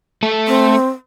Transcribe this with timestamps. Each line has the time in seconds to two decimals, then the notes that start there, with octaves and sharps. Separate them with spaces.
0.23 A3 A4
0.48 C4